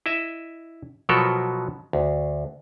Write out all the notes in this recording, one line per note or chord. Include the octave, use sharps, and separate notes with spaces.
E4 D#5 E5
B2 F3 F#3 B3 A4 A#4
D2